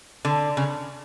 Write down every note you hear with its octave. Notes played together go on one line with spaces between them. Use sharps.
D3
C#3